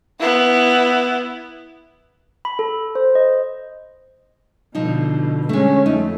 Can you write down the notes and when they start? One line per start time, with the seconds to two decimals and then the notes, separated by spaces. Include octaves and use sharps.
0.19 B3 E4
2.45 B5
2.59 A4
2.95 C5
3.15 D#5
4.75 B2 D3 F3 D#4
5.49 D3 G#3 A3 C#4
5.86 F2 A3 D#4